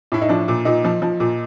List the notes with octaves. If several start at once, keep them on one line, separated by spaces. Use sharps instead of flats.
A2 E4
D#4
F3 D4
A#2
A#2 D#4
F3
F3
A#2